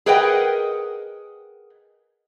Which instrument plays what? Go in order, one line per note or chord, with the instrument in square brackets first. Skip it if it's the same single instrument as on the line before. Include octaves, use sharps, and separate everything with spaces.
[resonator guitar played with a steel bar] G#4 A#4 B4 D#5 F#5 G5